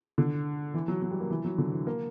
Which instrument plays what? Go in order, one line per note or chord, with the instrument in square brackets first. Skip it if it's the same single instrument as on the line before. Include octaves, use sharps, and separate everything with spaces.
[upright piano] D3
E3
F#3
F#3
G3
A#3
E3
F#3
D3
E3
A#3